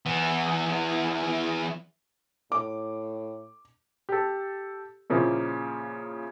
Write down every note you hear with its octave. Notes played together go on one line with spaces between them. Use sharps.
E3 B3
A2 D6
G4 A4
A#2 C#3 F3 A#3 E4